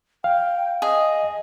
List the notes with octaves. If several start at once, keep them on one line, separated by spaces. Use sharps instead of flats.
F5 G5
G#4 D#5